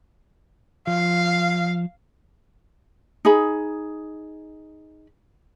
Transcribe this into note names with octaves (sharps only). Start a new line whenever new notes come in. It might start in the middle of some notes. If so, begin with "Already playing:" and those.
F3 F5
D#4 G#4 B5